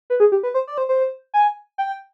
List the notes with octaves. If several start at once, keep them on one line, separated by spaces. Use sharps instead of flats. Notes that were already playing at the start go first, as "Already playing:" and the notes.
B4
G#4
G4
B4
C5
D5
C5
C5
G#5
G5